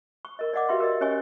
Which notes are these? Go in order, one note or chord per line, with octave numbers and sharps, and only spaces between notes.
C#6
A#4 D#5
D5 D#5 F#5 D6
F#4 G4 B4 E5 F5 C6
A#4 D5 D#5
C#4 G4 C#5 D#5 G#5 C#6